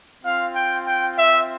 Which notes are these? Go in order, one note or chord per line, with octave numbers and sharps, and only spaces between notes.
C4 F4 F5
G5
G5
E5